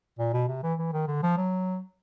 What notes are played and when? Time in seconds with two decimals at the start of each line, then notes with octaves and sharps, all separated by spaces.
0.19 A#2
0.33 B2
0.48 C3
0.63 E3
0.78 E3
0.93 D#3
1.07 D3
1.23 F3
1.37 F#3